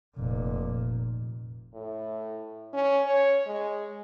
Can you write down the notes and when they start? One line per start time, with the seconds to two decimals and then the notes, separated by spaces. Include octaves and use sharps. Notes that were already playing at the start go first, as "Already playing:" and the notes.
0.17 F1 A#2
1.74 A2
2.73 C#4
3.06 C#5
3.46 G#3